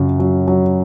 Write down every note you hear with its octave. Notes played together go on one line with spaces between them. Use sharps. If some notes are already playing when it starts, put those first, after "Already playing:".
Already playing: F#2 C#3 F#3
F#3
F#3